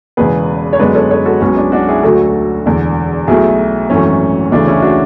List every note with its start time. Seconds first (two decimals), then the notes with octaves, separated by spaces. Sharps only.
0.17 E1 E2 C#3 G#4 B4
0.73 C#5
0.79 F#2 D3 G#3 B3 B4 D5
0.95 A4 C#5
1.10 A4 C#5
1.26 F#4 A4
1.41 B1 B2 G#3 B3 C#4
1.57 D4
1.72 D4 F#4
1.88 E4 G#4
2.03 D2 D3 F#3 A3 F#4 A4
2.66 E1 E2 D3
3.27 B1 B2 F#3 A3 E4 G#4
3.90 G#1 F#2 E3 A3 C#4
4.52 D2 C#3 E3 A3 D4
4.67 C#4 E4
4.82 D4 F#4